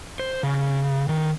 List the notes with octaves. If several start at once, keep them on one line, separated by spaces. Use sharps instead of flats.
C5
C#3
D#3